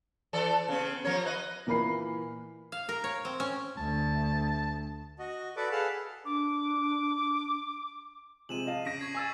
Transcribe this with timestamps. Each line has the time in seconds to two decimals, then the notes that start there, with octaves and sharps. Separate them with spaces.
0.33 E3 A4 D5
0.68 C#3 B3
1.05 F3 A#4 C#5
1.25 B4 D#5
1.67 A#2 E3 A#4 B5 C7
2.72 F5
2.89 A#4
3.04 C#5
3.25 C4
3.40 C#4
3.77 D2 A5
5.19 F#4 D#5
5.57 F#4 A4 B4 D5 F#5 D6
5.72 G#4 A4 B4 F5 F#5 A5
6.25 D4 D6
8.49 C3 F3 G#3 D#7 E7 F#7
8.67 D#5 F5 A5
8.85 C#3 A#6 B6 D7 D#7
9.00 C#6 G#6 C7
9.15 G#5 C#6 E6 A6